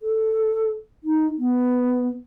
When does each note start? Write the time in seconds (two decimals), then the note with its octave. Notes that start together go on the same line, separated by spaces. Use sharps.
0.01 A4
1.04 D#4
1.38 B3